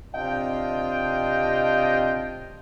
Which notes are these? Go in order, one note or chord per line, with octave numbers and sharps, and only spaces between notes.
C3 D4 F4 D#5 G5